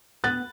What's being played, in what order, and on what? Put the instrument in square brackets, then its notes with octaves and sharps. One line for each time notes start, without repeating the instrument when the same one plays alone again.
[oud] B3 [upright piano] F#6 A6